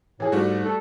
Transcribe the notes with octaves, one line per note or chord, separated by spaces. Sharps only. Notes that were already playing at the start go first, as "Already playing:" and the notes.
A2 E3 G#4
G#2 G3 A3 F#4
A4